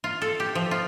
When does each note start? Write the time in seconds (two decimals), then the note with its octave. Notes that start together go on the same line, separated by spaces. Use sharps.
0.04 F4
0.22 A4
0.40 G4
0.55 F3
0.71 F4